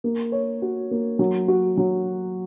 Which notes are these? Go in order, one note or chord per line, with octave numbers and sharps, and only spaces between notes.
A#3
C#5
F#4
A#3
F#3
F#4
F#3